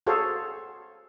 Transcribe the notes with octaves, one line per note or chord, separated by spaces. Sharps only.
F#4 G#4 A4 C5 C#5 F5